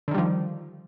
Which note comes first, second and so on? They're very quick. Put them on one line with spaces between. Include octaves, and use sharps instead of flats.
D3 D#3 G3 F3